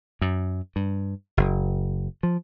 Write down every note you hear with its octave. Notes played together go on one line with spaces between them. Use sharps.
F#2
G2
F#1
F3